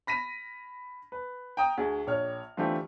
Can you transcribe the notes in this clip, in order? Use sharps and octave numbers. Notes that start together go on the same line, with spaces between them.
B5 A#6 B6 D#7
B4
G5 A#5 D#6
D2 G#4
A#1 C#5 F6
D3 E3 A3 C4 F4 G4